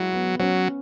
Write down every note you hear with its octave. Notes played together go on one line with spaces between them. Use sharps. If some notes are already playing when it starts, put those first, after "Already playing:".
Already playing: F#3 G#3 E4 G#4
B3
F#3 C#4